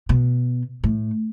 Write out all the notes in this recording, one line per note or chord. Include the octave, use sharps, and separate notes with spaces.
B2
A2